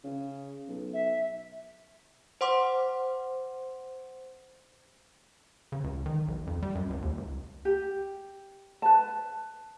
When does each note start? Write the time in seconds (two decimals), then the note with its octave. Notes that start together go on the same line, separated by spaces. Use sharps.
0.04 C#3
0.68 B1
0.93 E5
2.41 C5 F#5 C6 D6
5.72 C#3
5.84 C#2
6.06 D#3
6.28 B1
6.47 F2
6.62 G3
6.75 F#2
6.90 C#2
7.02 D#2
7.18 C#2
7.65 G4
8.82 B4 A5